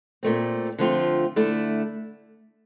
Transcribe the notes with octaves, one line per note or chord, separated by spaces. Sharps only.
A#2 A3 C4
D3 F3 A3 C4 F4
D3 A3 E4